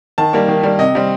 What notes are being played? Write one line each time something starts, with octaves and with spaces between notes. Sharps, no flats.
D#3 A5
G3 A#3
D#3
G3 A#3
C3 D#5
G3 C4